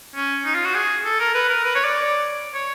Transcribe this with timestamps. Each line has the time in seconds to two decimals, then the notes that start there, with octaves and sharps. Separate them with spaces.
0.15 C#4
0.45 D#4
0.55 F4
0.65 F#4
0.75 G#4
1.05 A4
1.20 A#4
1.35 B4
1.49 A#4
1.64 B4
1.75 C#5
1.85 D5
2.54 C#5